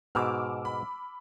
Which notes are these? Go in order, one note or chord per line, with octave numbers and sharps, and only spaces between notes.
G#2 B2 D6 E6 F6
B5